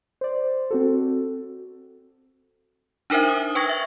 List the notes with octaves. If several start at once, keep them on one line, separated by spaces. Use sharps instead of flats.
C5 D5
C4 F#4 A4
D4 D#4 A#4 C5 E5
D#6
B4 G5 C#6 G#6 A#6
E5